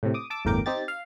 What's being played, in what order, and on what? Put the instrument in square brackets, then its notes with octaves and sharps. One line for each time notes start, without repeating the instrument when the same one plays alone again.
[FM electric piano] A2 C3
D6 D#6
A5 D6 E6
G1 E2 A2 A#4 G5 D6
C4 D#4 G4 A6
F5